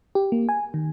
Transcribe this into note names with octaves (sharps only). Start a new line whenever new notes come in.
G4
A#3
G#5
D#3